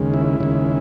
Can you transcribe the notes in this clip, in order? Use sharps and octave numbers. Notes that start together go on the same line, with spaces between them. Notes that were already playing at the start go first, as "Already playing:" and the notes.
Already playing: D#2 C#3 G#3
E4
D#2 C#3 G#3